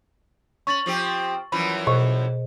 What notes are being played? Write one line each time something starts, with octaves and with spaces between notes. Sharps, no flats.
C#4 C#6 A6 F#7
F3 C4 G4
F#2 E3 F3 B5
B2 G#4 C5 D#5 C#6